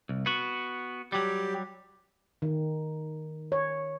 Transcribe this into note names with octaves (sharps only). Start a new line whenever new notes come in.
C2
B3 F#4
F#3 G3 G4
D#3
C#5